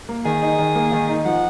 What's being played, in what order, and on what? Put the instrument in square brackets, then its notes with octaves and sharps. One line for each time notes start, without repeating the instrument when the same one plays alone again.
[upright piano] A#3
[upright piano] D#3 [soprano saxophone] G#4
[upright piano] D#4
D#3
A#3
D#3
D#4
[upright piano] F3 [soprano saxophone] F#5